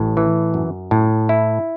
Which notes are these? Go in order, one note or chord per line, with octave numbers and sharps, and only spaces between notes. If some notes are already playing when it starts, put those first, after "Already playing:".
Already playing: A1 A2
E3
F#2
A2
E4